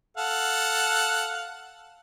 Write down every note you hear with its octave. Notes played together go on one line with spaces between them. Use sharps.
A4 F5 F#5